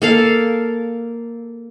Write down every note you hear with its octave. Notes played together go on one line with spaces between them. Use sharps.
A#3 A4 F5